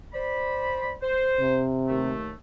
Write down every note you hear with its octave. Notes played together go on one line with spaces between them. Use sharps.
C5 D5 B5
C5
C3
D#2 A3